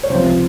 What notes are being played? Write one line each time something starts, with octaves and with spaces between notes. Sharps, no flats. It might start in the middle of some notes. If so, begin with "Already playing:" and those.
C#5
C#2 C3 F3 C5